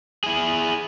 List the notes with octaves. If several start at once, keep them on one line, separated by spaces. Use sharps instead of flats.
E4 G#4